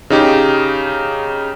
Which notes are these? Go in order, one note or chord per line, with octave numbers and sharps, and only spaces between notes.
C#3 D#4 G4